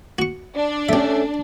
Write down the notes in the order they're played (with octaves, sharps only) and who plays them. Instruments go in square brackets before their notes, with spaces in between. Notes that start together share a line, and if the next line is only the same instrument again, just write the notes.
[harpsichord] F#4 C#6
[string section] D4
[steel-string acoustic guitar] A3 C#4 [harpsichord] G4 E5